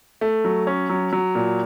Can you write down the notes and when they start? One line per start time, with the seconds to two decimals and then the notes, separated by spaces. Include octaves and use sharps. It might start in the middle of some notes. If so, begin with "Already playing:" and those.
0.21 A3
0.45 F#3
0.67 C#4
0.90 F#3
1.13 F#3
1.35 A#2